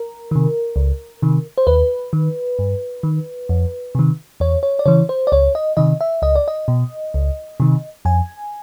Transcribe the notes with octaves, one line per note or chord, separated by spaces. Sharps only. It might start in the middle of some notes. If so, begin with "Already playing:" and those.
Already playing: A#4
C3 D#3
C#2
C3 D#3
C5
D#2 B4
D#3
G2
D#3
F2
C3 D#3
E2 C#5
C#5
D5
C#3 E3 C#5
C5
D5
C#2 C#5
D#5
C3 D#3 D#5
E5
C#2 D#5
D5
D#5
B2
C#2
C3 D#3
F2 G#5